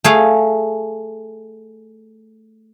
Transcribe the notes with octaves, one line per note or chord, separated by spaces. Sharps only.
A3 G#4 F5